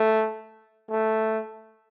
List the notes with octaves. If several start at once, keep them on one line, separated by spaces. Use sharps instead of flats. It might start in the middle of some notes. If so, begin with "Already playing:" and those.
Already playing: A3
A3